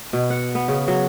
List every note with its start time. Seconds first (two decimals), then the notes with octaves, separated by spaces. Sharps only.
0.13 B2
0.30 F#5
0.55 B3
0.68 C#3
0.88 F#3